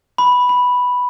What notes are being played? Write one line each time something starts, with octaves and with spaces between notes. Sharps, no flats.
B5
B5